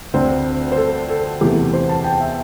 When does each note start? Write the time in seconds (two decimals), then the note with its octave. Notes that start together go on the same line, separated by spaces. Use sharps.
0.14 D2 D3 C4 C5
0.72 C5
0.77 A4
1.09 A4
1.41 E2 C3 E3 A3 G4
1.73 C5
1.89 A5
2.04 G5
2.20 E5